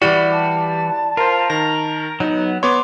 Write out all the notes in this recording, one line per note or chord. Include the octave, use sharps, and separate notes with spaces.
E3 G3 E4 F#4 G4 D5
A5
F4 A#4 C5
D#3 A#4 A#6
F#3 B3 D#4
B3 C#5 C6 D6